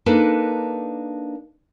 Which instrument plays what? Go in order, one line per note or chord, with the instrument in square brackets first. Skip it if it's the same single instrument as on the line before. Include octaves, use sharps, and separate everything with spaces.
[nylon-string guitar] A#3 D4 D#4 A4 B4